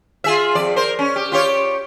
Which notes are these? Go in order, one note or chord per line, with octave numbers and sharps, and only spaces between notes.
F4 G#4 E5
F2 D5
A#4 C5
C#4
G4
F4 G4 C#5